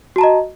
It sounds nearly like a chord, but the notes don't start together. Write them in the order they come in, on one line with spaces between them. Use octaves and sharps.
F#4 A5 A#5 D#5